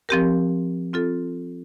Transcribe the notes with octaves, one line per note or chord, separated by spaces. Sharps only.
F3 C4 G4 A#4
C4 F4 A4